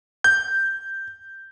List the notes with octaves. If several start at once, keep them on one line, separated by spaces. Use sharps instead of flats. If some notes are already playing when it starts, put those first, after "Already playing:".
G6